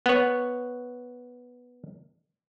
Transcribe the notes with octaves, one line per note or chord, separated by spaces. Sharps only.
B3 C#5